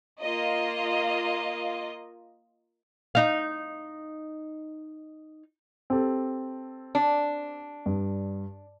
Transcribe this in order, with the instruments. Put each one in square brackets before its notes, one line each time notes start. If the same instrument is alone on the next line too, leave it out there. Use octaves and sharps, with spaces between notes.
[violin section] A#3 F4 D#5
[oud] D#4 F5
[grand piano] C4 G4 A4
[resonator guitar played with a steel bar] D4
[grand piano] G2